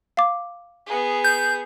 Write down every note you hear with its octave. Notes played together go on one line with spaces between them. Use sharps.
F5 D6
B3 G#4
G6